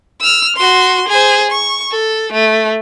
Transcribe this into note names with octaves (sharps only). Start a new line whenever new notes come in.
E6 F6
F#4 C6
G#4 C5
C#6
A4
A3